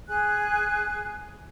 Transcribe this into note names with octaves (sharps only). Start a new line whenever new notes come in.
G#4 G#5 F#6